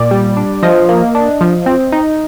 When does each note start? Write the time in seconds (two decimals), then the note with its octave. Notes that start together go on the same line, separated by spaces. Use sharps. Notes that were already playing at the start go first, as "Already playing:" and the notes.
Already playing: A#2 D5
0.11 G3
0.37 D4
0.63 F3 D#5
0.89 A#3
1.15 D4
1.41 F3
1.66 C4
1.92 D#4